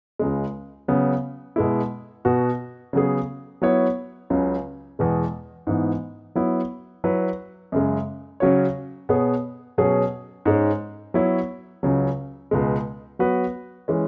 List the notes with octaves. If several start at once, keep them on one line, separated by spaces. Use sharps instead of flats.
C#2 C#3 G#3
C#3 F#3 B3
B2 G#3 E4
B2 B3 F#4
C#3 F#3 B3 G#4
F#3 B3 E4 C#5
C#2 C#3 F#3
E2 B2 G#3
G#2 E3 B3
F#3 B3 E4
F#3 E4 B4
F#2 C#3 G#3
C#3 F#3 C#4 F#4 C#5
B2 B3 G#4 C#5
B2 F#3 C#4 G#4
G#2 G#3 C#4
F#3 B3 E4 C#5
C#2 C#3 F#3
C#2 B2 G#3
F#3 B3 F#4 B4
E3 G#3 C#4